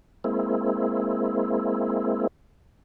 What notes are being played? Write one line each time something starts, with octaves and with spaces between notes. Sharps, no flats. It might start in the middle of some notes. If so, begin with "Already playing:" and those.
G#3 A#3 C4 E4